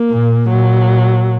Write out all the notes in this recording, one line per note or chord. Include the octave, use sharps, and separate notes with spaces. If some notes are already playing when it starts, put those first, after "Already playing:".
Already playing: A#3
A#2
A#2 F#3